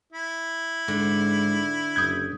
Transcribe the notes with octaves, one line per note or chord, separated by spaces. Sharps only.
E4
G#2 D3
F#1 D#6 G6 G#6